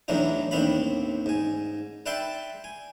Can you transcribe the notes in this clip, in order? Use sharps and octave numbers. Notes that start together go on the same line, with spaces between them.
E2 A2 E3 F#3 D4 D#4
A1 D#2 C4 D4 F5 B5
G#2 G#5
B4 D5 E5 G5 A5 C6
G#5